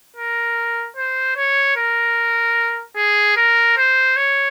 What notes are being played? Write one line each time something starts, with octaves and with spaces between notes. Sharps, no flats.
A#4
C5
C#5
A#4
G#4
A#4
C5
C#5